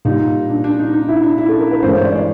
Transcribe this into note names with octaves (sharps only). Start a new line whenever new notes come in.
A#2 G3 D#4
D4
D4
D#4
D#4
E4
D4
E4
A4
A#4
B4
G2 E3 G#3 C5
C#5
D5
D5